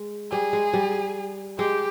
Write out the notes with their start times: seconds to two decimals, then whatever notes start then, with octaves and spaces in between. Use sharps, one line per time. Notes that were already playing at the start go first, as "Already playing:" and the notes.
Already playing: G#3
0.31 G3 G#4
0.53 G#3
0.73 G3
1.59 G#3 G4